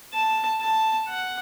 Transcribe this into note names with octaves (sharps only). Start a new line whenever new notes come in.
A5
A5
F#5